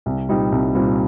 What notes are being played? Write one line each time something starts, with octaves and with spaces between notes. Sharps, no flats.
C2
A#2 G3 C4 D#4
C2
A#2 G3 C4 D#4